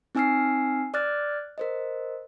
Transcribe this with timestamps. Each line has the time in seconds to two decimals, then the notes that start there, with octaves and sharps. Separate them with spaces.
0.15 C4 D#4 G#5 E6 F6 C7
0.94 D5 D6 F6 F#6 A6
1.58 A#4 C5 D#5